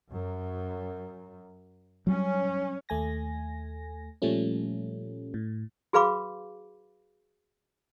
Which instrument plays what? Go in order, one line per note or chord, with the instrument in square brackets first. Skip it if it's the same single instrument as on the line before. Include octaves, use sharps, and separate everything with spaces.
[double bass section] F#2
[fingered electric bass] F#3 G3 [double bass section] C#4
[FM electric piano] D#2 A3 G#5 A#6
A#2 F3 G3 A3 C#4
A2
[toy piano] F#4 G#4 B4 F5 B5 D6